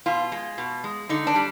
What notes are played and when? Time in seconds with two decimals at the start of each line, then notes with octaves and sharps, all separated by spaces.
0.06 B2 F4
0.32 G#3
0.58 B2
0.84 G#3
1.09 D3 D#4
1.27 D4
1.36 G3